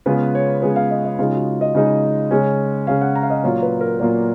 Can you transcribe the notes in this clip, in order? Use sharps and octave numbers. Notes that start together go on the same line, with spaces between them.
C#3 G#3 B3 F4 B4
C#5
C#3 G#3 B3 F4 B4
F5
D#5
D#5
C#3 G#3 D#4 F4
F#4
D#5
C#3 G#3 D#4
C#3 G#3 C#4
C#3 G#3 C#4 F5
F#5
A#5
F5
D#5
A#2 F#3 A#3 F4 C#5
B4
A#4
A#2 F#3 A#3 F4 A#4